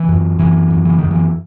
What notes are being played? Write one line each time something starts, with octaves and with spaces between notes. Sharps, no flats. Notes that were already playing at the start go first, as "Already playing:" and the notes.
Already playing: E3
F#2
F#2 E3
F#2
E3
F#2 D#3
E3